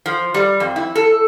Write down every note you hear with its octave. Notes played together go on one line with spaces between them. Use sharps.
F3
G3
F2
E4
A4